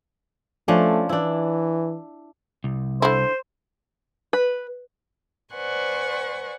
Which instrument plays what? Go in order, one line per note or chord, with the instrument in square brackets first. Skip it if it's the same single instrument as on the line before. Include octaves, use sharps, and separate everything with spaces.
[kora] F3 C#4 D4 [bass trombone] A3
[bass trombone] E3 [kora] D4 E4
[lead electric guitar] C2
[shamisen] D3 E4 [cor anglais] C5
[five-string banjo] B4
[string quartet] B4 C5 D5 F#5 G#5 C#6